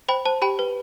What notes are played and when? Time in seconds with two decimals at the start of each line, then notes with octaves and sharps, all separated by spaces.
0.08 C5 G5 B5
0.25 C5 A5
0.42 G4 G5 B5
0.59 B4